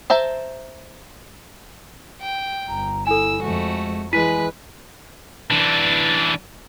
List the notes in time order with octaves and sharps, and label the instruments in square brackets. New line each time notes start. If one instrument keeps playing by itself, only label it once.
[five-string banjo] C5 E5 A5 A#5
[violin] G5
[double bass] G1 [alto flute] A#5
[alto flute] E4 [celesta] A4 G#5 [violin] E6
[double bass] F2 [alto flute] G#3 [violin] A3 F#4
[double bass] E3 G#3 [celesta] E4 B6 D#7 [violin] B4 F#6 [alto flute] G#5
[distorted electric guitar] E3 D4